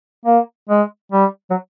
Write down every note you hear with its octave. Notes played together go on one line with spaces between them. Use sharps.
A#3
G#3
G3
F#3